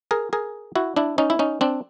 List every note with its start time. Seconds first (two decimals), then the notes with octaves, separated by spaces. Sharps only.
0.11 G#4 A#4
0.33 G#4 A#4
0.76 E4 F#4
0.96 D4 E4
1.18 C#4 D#4
1.30 E4
1.39 C#4 D#4
1.61 C4 D4